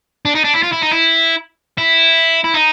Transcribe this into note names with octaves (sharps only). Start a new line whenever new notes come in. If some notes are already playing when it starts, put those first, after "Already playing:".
D4
D#4
D4
E4
F4
E4
D#4
E4
E4
E4
D#4